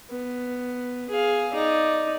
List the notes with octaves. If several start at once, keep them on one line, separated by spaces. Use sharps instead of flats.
B3
G#4 F5
D#4 D5